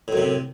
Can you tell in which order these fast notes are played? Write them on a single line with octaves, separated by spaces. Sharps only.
A2 F#2 C3